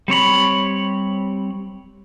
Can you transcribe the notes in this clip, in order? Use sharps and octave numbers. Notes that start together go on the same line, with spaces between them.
G3 C4 C#5 B5